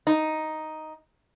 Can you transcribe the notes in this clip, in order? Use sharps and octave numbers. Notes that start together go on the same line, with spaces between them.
D#4